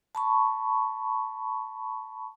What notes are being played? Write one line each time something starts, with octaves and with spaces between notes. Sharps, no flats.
A5 B5 C#6